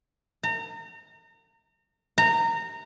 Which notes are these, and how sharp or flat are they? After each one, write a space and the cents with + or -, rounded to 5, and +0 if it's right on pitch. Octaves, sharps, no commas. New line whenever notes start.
A#5 -35
A#5 -20